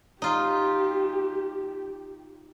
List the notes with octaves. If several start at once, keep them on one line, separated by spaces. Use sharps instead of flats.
D#4 F4 G4